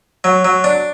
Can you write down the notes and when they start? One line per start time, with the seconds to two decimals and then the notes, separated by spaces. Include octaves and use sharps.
0.24 F#3
0.45 F#3
0.64 D4